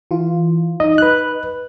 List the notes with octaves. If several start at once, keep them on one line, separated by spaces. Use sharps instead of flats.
E3 F4
D#4 D#5
B4 F#6